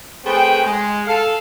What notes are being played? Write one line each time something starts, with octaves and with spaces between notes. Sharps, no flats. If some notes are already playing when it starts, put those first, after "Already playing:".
A3 C4 G#4 B4 G5
G#3
A4 F5